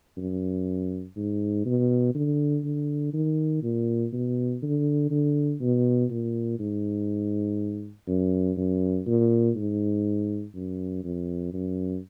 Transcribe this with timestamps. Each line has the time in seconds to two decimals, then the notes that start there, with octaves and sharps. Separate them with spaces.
0.17 F#2
1.16 G#2
1.66 B2
2.15 D3
2.64 D3
3.13 D#3
3.63 A#2
4.13 B2
4.62 D3
5.11 D3
5.61 B2
6.10 A#2
6.59 G#2
8.08 F#2
8.57 F#2
9.06 A#2
9.56 G#2
10.55 F#2
11.04 F2
11.53 F#2